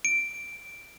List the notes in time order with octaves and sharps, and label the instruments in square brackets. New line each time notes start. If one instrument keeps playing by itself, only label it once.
[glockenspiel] D7